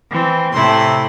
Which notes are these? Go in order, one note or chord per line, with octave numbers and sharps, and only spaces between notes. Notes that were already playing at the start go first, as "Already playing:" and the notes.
E3 C4
A2 C3 A3 E4 C6